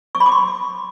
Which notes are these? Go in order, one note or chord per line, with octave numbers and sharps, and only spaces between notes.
C#6
B5
D6
C6